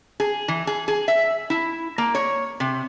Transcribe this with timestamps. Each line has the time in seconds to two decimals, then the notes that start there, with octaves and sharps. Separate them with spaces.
0.20 G#4
0.48 E3
0.67 G#4
0.88 G#4
1.08 E5
1.50 E4
1.98 A#3
2.15 C#5
2.60 C3